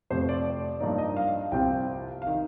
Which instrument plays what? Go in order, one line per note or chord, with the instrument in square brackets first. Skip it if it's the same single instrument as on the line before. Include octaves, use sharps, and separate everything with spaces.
[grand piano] F2 C3 F3 A3 C5
D5
G2 F3 A#3 D#4 D5
D#5
F5
C2 C3 F3 C4 F4 G5
F5
D#3